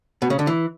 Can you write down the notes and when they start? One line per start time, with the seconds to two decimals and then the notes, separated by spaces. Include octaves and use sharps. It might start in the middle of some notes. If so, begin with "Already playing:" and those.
0.22 B2
0.30 C#3
0.39 D3
0.47 E3